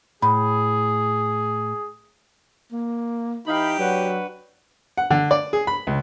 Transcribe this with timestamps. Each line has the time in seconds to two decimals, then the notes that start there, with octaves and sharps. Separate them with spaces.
0.22 A2 G#4 B5
2.72 A#3
3.47 E3 D#4 G4 F5 B5
3.79 F#3 D4 F#4 B4
4.98 F#5
5.11 D3
5.31 D5
5.53 G#4
5.67 B5
5.87 C#2